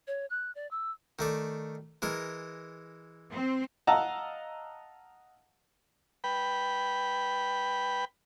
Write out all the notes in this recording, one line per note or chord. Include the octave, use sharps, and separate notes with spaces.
C#5
F#6
D5
E6
D#3 A3 D5
E3 G#3 A#4
C4
D#5 F5 F#5 A5 A#5 E6
B4 G5 B5